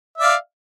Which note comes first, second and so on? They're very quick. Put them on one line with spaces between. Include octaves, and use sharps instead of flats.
E5 D5 F5